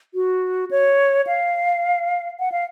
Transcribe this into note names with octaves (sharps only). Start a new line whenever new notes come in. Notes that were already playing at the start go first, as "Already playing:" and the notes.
F#4
C#5
F5
F#5
F5